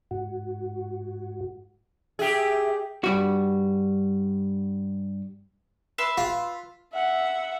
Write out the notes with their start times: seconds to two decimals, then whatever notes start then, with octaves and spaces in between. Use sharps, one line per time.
0.11 G#2 F#4
2.19 G4 G#4 E5
3.04 G2 G3 F#4
5.98 B4 E5 C6
6.17 F4
6.93 E5 F#5